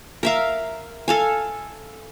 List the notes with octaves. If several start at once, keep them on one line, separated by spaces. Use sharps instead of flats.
A#4 E5 F5
A4 F5 G#5